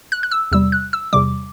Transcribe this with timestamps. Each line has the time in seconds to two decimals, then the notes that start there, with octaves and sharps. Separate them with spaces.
0.12 F#6
0.23 F#6
0.31 E6
0.52 E2 C3 G3 E6
0.72 F#6
0.93 E6
1.13 E2 C3 G3 D6